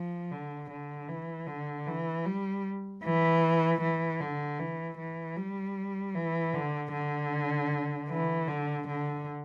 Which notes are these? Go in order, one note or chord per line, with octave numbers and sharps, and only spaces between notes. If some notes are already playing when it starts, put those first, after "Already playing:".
Already playing: F3
D3
D3
E3
D3
E3
G3
E3
E3
D3
E3
E3
G3
E3
D3
D3
E3
D3
D3